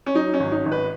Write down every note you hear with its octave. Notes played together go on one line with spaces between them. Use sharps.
C#4
F#3 D#4
C#4
G#1
D#4
G#1
B4